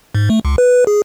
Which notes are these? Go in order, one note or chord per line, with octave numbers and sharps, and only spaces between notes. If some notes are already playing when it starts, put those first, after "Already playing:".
G#2
A3
C#2
B4
G#4